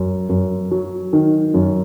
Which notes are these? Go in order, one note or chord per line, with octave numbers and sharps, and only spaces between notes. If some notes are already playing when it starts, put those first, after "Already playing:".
Already playing: F#2
F#2
F#3
D#3
F#2